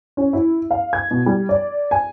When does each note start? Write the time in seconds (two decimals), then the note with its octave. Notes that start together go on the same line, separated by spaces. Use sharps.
0.17 C#4
0.33 E4
0.71 F5
0.93 G#6
1.11 B2
1.26 G3
1.49 D5
1.91 G#5